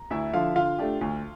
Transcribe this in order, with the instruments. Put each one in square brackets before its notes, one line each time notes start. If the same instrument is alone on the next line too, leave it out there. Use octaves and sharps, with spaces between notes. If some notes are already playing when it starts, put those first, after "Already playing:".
Already playing: [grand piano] A#5
[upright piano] D2 [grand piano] E4 E5
[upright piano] D3 F3 [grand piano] F4 F5
[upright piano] D3 [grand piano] F4 F5
[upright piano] A3 D4 G4
D2